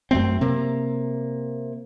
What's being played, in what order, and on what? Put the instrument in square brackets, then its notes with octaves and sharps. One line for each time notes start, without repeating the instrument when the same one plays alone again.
[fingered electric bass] F#2 A3 C4
C3 A#3